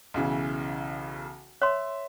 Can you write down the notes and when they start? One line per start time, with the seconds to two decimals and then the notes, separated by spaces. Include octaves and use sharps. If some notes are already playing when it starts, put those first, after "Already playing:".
0.14 B1 C#3 E3
1.62 C#5 E5 C6